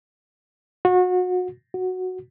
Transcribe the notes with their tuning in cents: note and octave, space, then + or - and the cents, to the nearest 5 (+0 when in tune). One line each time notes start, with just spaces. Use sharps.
F#4 -30
F#4 -5